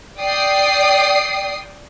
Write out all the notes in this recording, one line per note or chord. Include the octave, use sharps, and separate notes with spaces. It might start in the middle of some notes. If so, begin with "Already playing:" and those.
D5 G5 D#6 C7